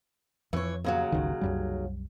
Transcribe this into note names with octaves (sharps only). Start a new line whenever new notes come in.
F2 E3 C#5
D#2 C#3 F#3
G1 C#2 D#3
C2 F#2 G3